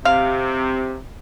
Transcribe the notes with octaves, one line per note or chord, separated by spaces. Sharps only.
C3 F5